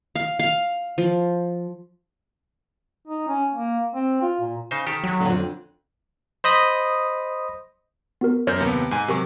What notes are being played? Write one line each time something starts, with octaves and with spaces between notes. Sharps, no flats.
F5
F5
F3
D#4
C#4
A#3
C4
F4
A#2
C#3 D#4 C5
D#3 G4 A4
F#3
F2 G#2 D3
C5 D#5 B5 D#6
B3 F#4 A#4
F#2 A#4 C#5 G6
D#2 C3 B3
G#2 G#5
C3 F#3 G4 A#4 C#6